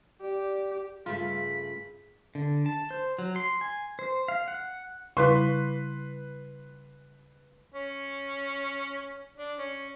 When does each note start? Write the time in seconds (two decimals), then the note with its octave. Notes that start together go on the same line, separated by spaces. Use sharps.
0.21 G4 D5
1.06 G2 C#3 A3 F4 G#4 B5
2.35 D3
2.66 A5
2.91 C5
3.19 F#3
3.36 C6
3.61 G#5
3.99 C5
4.28 F5
4.48 F#5
5.17 C#3 G3 E4 B4 C6
7.74 C#4
9.37 D4
9.58 C#4